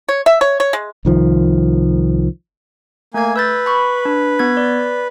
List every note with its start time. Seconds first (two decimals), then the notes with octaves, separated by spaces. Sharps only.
0.09 C#5
0.26 E5
0.41 C#5
0.60 C#5
0.73 G#3
1.05 C2 D#3 F3
3.14 A3 A#3 G#5 G#6
3.36 B4 E6 G6 A6
3.66 B5 C#6
4.05 D4
4.39 B3 G#6
4.57 D5